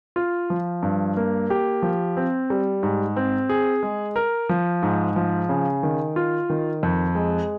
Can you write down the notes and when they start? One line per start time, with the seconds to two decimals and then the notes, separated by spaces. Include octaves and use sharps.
0.16 F4
0.50 F3
0.83 G2
1.17 A#3
1.50 G4
1.82 F3
2.17 C4
2.50 G3
2.83 G#2
3.16 C4
3.49 G#4
3.83 G#3
4.16 A#4
4.49 F3
4.83 G#2
5.16 F3
5.49 C#3
5.83 D#3
6.16 F4
6.50 D#3
6.83 F2
7.15 G#3